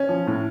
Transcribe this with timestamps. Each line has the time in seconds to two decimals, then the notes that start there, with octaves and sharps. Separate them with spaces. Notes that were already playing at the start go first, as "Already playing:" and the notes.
Already playing: C#4
0.09 F3
0.27 A2